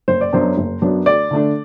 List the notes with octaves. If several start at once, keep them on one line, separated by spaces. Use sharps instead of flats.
F#1 C5
D5
F#2 F#3 B3 D4 C5
F#1
F#2 F#3 B3 D4
D2 D5
D3 A3 D4